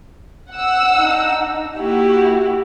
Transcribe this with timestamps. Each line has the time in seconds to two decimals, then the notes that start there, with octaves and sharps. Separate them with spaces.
0.53 F#5 E6
0.93 D4 D#4
1.77 A#3 E4 F#4 G4